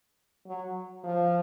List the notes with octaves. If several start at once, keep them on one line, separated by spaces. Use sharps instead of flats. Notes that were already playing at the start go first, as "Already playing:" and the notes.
F#3
F3